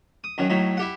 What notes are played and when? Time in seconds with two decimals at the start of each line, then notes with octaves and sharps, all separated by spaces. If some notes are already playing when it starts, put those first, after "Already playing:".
0.24 D#6
0.38 F#2 D#3 F#3
0.50 A2 F#3 D#4
0.77 E4 G4 F#5